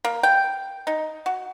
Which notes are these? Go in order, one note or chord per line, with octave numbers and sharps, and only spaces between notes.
A#3
G5
D#4
F#4